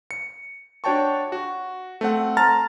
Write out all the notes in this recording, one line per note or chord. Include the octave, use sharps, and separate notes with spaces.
C#7
D4 F#4 C#5 G5 A5 C#6
F#4
A3 C4 F#5
A5 A#5 C6 F6 A6